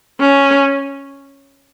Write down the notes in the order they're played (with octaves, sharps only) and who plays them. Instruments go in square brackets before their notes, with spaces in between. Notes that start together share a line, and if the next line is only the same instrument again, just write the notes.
[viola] C#4